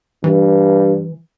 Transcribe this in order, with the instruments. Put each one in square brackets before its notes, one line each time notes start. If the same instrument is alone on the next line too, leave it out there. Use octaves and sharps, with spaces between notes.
[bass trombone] G2 [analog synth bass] E3